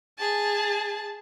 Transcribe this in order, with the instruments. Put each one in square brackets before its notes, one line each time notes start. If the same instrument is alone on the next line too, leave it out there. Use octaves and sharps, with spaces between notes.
[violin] G#4 A5